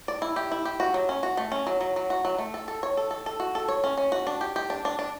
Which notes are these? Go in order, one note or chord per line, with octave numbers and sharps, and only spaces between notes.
D5
E4
G4
E4
G4
F#4
F#3
C#4
F#4
A3
C#4
F#3
F#3
F#3
F#4
F#3
A3
A4
A4
C#5
A4
A4
A4
F#4
A4
C#5
C#4
C#4
F#4
D4
G4
G4
D4
D4
D4